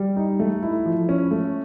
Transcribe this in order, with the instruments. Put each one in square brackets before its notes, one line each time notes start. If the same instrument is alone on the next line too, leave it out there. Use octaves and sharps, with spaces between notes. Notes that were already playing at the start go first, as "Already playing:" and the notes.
Already playing: [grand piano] G3
D#4
A3
E4
F3
C#4
A3